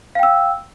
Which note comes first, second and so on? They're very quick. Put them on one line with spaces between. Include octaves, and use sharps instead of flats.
F5 G5 E6